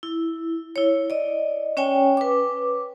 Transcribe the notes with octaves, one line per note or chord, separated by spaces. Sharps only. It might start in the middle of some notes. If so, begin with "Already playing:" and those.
E4
E4 C#5
D5 D#5
C#4 C#5 G5 G#5
B4 D6